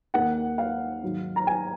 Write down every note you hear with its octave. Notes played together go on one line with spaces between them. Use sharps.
D#2 D#3 A#3 D#4 F#5
F5
G#2 D#3 F#3
A#5
G#5